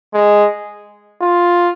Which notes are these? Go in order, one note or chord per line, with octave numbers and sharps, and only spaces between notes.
G#3
F4